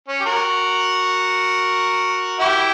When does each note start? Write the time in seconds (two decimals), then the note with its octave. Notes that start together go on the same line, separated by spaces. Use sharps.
0.08 C#4
0.20 G4
0.25 F#4 A#4
2.39 E4 G4